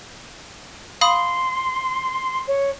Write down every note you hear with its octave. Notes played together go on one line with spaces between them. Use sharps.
F5 B5 C6 D#6
C#5